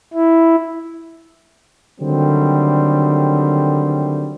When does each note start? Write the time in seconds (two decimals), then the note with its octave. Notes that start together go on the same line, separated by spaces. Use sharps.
0.14 E4
2.00 D3 D#3 F#3 G3 A3 C4